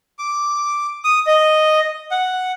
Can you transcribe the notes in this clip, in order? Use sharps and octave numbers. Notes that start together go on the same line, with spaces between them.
D6
D#6
D#5
F#5